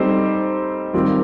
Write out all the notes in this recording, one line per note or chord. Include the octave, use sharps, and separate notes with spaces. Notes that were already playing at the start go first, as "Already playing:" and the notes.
Already playing: G3 C4 D#4 A4 C5
D#3 G3 C4 F4 A#4